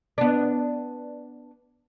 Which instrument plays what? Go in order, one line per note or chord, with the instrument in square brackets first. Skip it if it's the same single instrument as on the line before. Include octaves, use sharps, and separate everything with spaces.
[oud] B3 D4